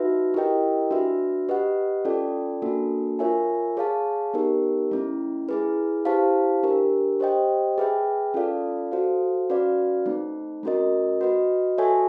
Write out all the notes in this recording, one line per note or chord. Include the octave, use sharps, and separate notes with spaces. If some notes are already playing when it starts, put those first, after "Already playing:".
Already playing: D#4 F#4 B4 E5
E4 G4 A#4 D#5 G5
D4 F#4 B4 E5
G4 B4 D#5 F#5
C#4 F4 A4 D5 G5
A#3 D4 F#4 A4
F4 A#4 C#5 E5 G#5
G#4 C#5 F5 A5
B3 D#4 G4 A#4
A3 C#4 E4
E4 G#4 B4
E4 G4 C5 F5 A5
D4 G4 A#4
G4 C5 D#5 G5
G#4 B4 E5 G5
C#4 F4 A4 D5 F5
F#4 A4 C5 F5
C#4 F#4 B4 D5 F5
A3 C4 D#4
A3 C#4 F#4 A#4 D#5
F#4 B4 D#5
F#4 A4 C#5 E5 G#5